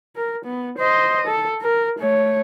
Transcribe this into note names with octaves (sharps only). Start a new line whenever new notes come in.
A#4
B3
C5 D#5
A4
A#4
A3 C#5